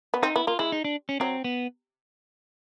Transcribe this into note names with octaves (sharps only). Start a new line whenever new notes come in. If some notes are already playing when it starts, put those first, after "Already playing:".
B3
C4 D#4
B3 E4
A#3 F4
G#3 E4
D#4
D4
C#4
F#3 C4
B3